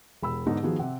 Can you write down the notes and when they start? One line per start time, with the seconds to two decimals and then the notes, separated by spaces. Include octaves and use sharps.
0.22 E1 B5 E6
0.47 G#2 D3 B3 D4 D#4
0.63 D#3 F3 B3 F#4 G#4
0.79 C3 C4 F#5